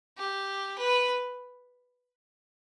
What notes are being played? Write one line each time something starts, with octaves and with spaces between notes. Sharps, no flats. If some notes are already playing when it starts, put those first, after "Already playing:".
G4
B4